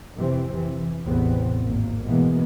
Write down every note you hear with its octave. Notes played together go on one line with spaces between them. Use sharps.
F2 C3 E3 C4
E3
A1 E2 A2 C3 B3 C4
G#1 A#3
B2 E3 G#3 A#3 B3